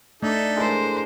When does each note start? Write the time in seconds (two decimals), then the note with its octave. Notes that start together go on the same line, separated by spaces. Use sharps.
0.23 A3 D4 D#4 A4 D5 E5
0.57 A2 G#3 A#4 C5